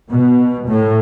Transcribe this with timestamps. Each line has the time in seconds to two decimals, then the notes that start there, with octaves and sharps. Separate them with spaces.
0.10 B2
0.67 A2